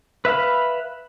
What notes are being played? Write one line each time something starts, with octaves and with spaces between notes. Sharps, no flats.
B4 E5 F5 B5